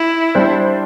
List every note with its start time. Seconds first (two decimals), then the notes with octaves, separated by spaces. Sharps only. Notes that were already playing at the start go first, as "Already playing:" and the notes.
Already playing: E4
0.35 G3 D4 C5